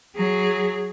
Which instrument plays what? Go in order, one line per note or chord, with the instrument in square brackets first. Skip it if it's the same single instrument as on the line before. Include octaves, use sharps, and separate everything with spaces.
[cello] F#3 G#4